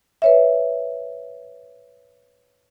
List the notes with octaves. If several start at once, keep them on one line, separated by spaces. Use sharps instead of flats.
B4 C#5 E5